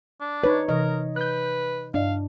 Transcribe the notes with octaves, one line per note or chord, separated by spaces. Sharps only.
D4
D#4 B4 C#5
C3 E3 A#4 D#5
B4 F#6 G6
G2 D4 D5 D#5 F5